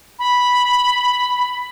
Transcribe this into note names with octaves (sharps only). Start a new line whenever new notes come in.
B5